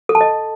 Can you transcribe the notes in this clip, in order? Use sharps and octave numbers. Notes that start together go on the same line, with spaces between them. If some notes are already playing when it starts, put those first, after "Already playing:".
A4
A5
D#5